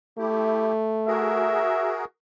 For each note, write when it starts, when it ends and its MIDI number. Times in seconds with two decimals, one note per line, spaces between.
0.18 1.69 57
0.18 0.72 64
0.18 0.72 67
1.07 2.05 66
1.07 2.05 68
1.07 2.05 70
1.07 2.02 76